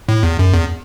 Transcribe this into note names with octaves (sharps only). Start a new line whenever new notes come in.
A2
E2
F#2
E2